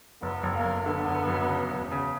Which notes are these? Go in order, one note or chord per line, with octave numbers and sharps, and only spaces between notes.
F#1 B3
F#1
A#3
F#1
D3 B3
F#1
F#2
C#3
E1
C#3